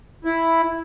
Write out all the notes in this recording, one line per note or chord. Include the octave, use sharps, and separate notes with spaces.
E4